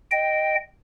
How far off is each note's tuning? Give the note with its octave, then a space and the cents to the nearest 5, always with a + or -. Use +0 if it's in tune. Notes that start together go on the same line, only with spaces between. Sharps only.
D#5 +0 G5 -5